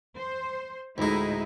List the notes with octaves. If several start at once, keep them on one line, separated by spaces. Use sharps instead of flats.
C5
D2 A2 G#3 D#4 E4